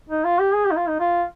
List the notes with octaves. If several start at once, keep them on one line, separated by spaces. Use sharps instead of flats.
D#4
F4
G4
G#4
G4
D#4
F4
D#4
F4